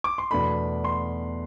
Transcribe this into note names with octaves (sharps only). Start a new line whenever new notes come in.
D6
C6
E2 B2 A3 D4 B5
C6